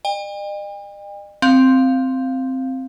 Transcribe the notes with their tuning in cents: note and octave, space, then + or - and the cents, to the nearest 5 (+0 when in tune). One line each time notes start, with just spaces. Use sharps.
D#5 -45 G5 +45
C4 +0 F5 +0